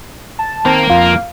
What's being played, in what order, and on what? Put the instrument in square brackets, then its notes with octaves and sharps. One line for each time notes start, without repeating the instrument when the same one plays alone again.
[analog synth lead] A5
[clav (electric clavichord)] D#3 C4 [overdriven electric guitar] A#3 A#4
[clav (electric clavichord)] F2 F4 [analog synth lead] F5